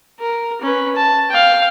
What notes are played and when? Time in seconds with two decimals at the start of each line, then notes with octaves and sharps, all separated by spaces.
0.19 A#4
0.61 C#4 B4
0.95 A5
1.30 F5 G5